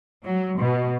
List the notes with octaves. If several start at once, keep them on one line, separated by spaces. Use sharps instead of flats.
F#3
B2